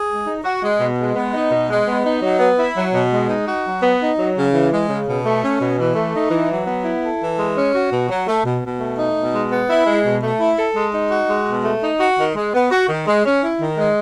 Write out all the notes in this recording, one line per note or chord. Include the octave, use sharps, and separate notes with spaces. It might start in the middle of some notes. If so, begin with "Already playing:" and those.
Already playing: G#4
G#3
D#4
F#4
G#3
B2
G#3
B3
D#4
B2
G#3
B3
D#4
F#3
B3
E4
F#3
B2
G#3
D#4
F#4
F#3
B3
D#4
F#3
C#3
E3
G#3
C#3
B2
A3
C#4
B2
E3
A3
D#4
E3
F#3
B3
E4
A4
E3
G#3
C#4
F#4
B2
F#3
A3
B2
B2
A3
D#4
B2
G#3
B3
E4
G#3
B2
A3
E4
A4
G#3
D#4
F#4
G#3
B2
A3
D#4
F#4
D#3
G#3
B3
F#4
D#3
G#3
C#4
E4
D#3
G#3